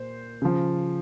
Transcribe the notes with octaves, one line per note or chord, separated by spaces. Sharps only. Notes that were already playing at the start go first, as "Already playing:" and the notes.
Already playing: A#2 C5
C#3 F3